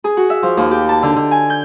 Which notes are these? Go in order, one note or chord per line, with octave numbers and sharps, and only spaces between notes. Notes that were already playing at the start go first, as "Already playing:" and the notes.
G#4
F#4
E5
F3
D#2
G4
A5
D3
D3
G#5
G6